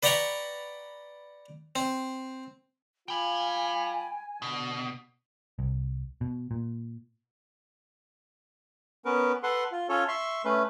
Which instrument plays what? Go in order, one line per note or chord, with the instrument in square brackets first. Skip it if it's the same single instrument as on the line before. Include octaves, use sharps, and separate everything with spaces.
[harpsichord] B4 D5 F#5 G5 A#5 C#6
C4
[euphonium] F4 [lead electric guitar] G5 B5 [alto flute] G#5
[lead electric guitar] B2 [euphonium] D3
[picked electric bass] C2
B2
A#2
[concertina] B3 C#4 A#4 B4
A4 B4 F#5 C6
F4
C#4 F4 A4 C#5
E5 C6 C#6
A3 C#4 B4